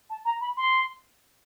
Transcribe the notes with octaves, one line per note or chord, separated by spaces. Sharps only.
A5
A#5
B5
C6